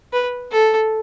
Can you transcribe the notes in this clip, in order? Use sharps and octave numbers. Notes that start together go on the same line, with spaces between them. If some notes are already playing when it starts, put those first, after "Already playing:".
B4
A4